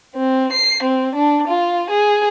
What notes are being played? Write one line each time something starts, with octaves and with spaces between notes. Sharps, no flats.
C4
C7
C4
D4
F4
G#4